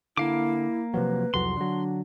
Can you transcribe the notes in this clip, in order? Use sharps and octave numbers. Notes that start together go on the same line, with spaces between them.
D3 A#3 E4 F5 D6
C3 F3 F#3 B4
C2 F2 F#3 C6
D3 F#3 D4